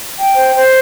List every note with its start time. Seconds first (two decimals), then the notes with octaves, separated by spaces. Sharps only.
0.17 G5
0.36 C5
0.55 C5